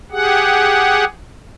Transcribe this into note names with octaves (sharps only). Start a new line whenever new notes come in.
G4 G#4 F#5